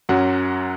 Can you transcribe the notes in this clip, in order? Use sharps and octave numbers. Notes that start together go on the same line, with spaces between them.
F#2 F#3 C#4 F#5